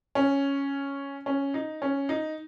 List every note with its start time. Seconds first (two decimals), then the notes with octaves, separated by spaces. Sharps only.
0.15 C#4
1.26 C#4
1.54 D#4
1.82 C#4
2.09 D#4